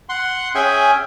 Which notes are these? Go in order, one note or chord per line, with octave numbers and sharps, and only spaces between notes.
F#5 C6
C#4 G#4 E5 G5 G#5